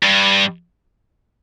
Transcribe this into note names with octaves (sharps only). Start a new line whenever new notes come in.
G2